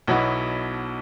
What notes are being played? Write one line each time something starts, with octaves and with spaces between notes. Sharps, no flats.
B1 B2 F#3 B3 E4